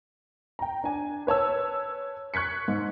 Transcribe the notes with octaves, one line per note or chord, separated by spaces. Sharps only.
G5 A#5
D4 G#5
B4 C#5 A5 E6
C#6 F#6 G#6 B6 C#7
G#2